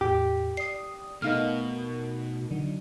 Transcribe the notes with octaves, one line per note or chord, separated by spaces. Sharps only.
E2 A2 G4
D5 D#6 C7
B2 A3 D#4 A#4 D#5 F5 F6
D3 F#3 D#4